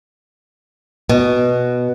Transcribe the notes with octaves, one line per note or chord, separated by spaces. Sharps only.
B2